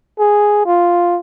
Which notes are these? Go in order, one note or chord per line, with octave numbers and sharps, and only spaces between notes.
G#4
F4